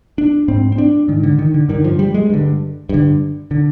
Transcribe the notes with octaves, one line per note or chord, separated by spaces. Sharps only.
D4
G#2 C4
C4
D4
G#2 D#3
D3
D#3
D3
G2 D3 D#3
F3
G3
G#3
G2 D3
G2 D3
D3